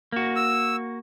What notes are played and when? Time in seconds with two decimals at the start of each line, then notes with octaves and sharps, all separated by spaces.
0.12 A#3 F#4
0.36 E6